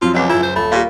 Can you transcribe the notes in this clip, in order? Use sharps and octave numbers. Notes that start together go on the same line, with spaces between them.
F2 F3 F#3 F4
C#2 B2 C#5 F#5 D6
F#2 E4 F4 G6
C5
D#1 A3 B5
A#2 G4 A#4 F5